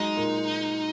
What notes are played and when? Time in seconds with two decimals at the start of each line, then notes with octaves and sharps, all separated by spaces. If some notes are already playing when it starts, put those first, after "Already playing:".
Already playing: F#3 G#3 D#4
0.16 A#2